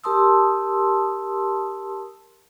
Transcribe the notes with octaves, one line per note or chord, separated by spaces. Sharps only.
G4 A#4 A5 C6 D#6 E6